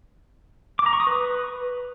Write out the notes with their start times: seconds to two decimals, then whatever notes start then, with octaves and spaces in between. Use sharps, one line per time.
0.79 D6
0.86 A#5
0.93 C#6
1.00 D#6
1.07 B4